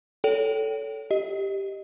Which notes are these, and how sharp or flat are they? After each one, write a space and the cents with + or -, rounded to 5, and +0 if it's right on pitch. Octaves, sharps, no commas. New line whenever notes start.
A4 +0 C#5 +30 G5 -25
G4 +0 D#5 +0